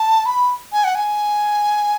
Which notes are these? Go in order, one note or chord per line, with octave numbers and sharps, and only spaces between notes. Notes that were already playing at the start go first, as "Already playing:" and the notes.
Already playing: A5
B5
G#5
F#5
G#5